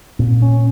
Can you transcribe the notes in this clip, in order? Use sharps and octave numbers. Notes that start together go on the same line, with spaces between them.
A#2 C4
C#4